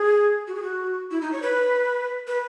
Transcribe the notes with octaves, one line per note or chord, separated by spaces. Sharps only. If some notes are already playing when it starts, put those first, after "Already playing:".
Already playing: G#4
F#4
G#4
F#4
E4
D#4
C#5
B4
B4